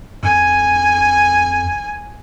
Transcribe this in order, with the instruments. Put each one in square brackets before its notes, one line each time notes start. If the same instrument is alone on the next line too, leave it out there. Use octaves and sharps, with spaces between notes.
[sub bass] F2 [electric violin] G#5